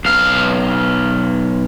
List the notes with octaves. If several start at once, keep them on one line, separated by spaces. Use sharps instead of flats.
B1 F5